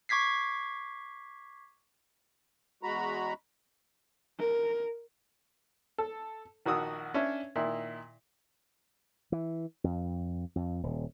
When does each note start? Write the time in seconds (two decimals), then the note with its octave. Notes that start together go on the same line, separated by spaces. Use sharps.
0.09 C#6 D6 G#6 B6 C7
2.83 E2 G#3 F#4 A#5 B5
4.39 A#4
5.98 A4
6.66 A#1 D#3 F#4 F#5 D#6 E6
7.14 C#4 D4 C#5 E5
7.56 A#2 D#3 E4
9.32 E3
9.84 F2
10.56 F2
10.83 D#1